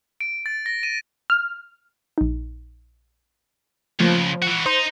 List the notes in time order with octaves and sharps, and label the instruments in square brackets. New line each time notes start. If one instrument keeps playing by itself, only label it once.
[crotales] D7
A6
A#6
D#7
[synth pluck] F6
[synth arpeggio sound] A#1 D#4
[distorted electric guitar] C#2 [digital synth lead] F3 [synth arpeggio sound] A3 A#3
[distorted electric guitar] E3 F#4
[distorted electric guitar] D#4 [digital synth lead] C5 [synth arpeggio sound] A#5 C6 D#6